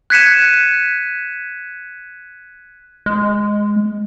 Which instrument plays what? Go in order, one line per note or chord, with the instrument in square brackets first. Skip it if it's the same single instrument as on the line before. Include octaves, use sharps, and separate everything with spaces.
[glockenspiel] F#6 G#6 B6 C#7 D#7 E7
[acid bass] G#3